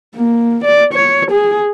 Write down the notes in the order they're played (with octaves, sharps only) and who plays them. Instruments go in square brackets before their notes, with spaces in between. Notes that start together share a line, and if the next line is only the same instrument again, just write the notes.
[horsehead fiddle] A#3
D5
C#5
G#4